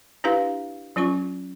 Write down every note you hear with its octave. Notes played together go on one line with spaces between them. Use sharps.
D4 E4 G4 B4 F5
F#3 C#4 F4 C#6